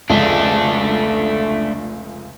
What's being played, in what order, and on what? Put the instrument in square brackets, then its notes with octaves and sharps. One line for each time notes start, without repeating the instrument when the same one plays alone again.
[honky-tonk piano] F1 C#2 G#3 [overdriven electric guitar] A3 D4